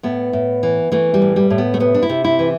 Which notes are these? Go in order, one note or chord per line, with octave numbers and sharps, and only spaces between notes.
A2 B3
A2
E3
E3 A3
G3
A2
G3
A2
B3
A3
C3 B3
D4
E4
C3
E4
E3